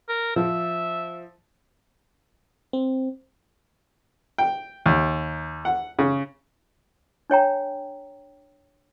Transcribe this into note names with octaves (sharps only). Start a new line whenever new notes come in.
A#4
F3 E5
C4
G5
D#2
F#5
C#3
D4 C#5 G5 A#5